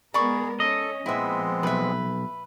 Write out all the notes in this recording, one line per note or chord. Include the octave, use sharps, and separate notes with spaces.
G#3 B3 G#4 A#4 D5 B5 C#6
C#4 A4 D#5
A#2 F3 G#3 B3 C4 E4 E5
B1 B4 E5